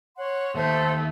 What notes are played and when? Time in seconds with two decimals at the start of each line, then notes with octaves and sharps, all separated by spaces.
0.17 C#5 F#5 C6
0.55 D#2 A3 A4 C5